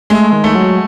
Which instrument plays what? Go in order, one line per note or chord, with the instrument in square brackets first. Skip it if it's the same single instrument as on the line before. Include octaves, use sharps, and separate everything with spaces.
[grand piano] G#3 [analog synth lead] A3
[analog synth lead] D#3
[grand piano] A3
[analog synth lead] F#3